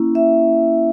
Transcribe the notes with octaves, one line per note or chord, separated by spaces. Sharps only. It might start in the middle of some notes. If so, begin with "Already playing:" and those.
Already playing: A#3 C#4 E4
E5